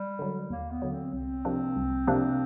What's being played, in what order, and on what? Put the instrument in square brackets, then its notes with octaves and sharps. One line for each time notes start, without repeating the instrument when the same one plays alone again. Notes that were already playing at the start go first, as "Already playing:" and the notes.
Already playing: [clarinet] G3
[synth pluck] D3 F#3
[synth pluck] D#2 [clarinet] A#3
[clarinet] B3
[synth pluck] D3 F#3
[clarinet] C4
[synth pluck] C2 [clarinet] C4
[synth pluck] C3 F3 A#3 D4
C2
C3 F3 A#3 D4